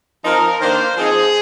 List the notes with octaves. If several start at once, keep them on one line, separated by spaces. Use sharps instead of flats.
F3 C4 D#4 A#4
D#3 A#3 D4 C5
F3 C4 D#4 G#4